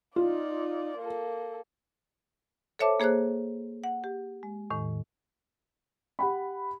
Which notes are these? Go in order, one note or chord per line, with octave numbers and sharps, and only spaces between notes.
D#4 F4 D5
A#3 A4
A4 C5 C#5 E5 A5 D6
A#3 G#4 C5 C#5 F#6
F#5
G4
G#3
E2 A2 D#3
G4 F#5 B5